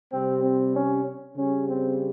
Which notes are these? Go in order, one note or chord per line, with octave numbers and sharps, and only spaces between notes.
C3 G3 C4
C4
C#4
C#3 G3 C#4
C4